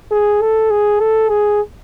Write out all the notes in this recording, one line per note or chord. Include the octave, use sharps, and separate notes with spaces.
G#4
A4
G#4
A4
G#4